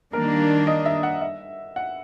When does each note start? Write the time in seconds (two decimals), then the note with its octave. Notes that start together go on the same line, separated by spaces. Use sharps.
0.13 D#3 G3 A#3 D4 A#4
0.67 D#5
0.86 E5
1.03 F#5
1.21 E5
1.76 F#5